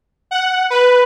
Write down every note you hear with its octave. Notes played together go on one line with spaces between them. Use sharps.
F#5
B4